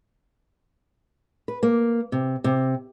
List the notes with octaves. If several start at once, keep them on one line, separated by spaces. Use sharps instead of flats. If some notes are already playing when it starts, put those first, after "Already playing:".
B4
A#3
C3
C3